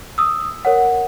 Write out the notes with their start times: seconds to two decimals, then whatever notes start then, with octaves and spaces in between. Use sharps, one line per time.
0.18 D#6 E6
0.65 A#4 C#5 F#5